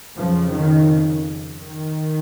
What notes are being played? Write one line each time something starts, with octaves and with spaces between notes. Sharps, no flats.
F2 C#3 F3
D#3
D#3